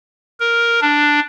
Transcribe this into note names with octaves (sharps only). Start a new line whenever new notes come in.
A#4
D4